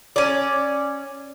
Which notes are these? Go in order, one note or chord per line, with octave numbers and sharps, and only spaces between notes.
C#4 D5